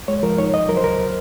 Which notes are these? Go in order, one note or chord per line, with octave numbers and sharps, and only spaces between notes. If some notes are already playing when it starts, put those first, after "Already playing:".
Already playing: C#2
G#3 C#5
F3 A#4
D#4 C#5
C2 D#5
F#3 A#4
C5
C#2 A#4